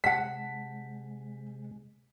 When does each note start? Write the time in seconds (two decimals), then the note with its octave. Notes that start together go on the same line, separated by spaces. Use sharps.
0.04 C3 G#3 F#5 A5 B6